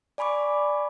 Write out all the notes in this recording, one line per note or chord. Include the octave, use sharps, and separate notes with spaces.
D5 G#5 B5 C#6 D6